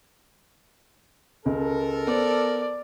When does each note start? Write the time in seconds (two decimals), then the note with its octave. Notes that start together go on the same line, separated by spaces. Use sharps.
1.46 C#2 A4 A#4
2.07 B3 C5 D5